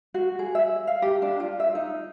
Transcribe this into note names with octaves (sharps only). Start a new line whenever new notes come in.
F#4
G#4
E5
F5
G4
D4
F4
E5
D#4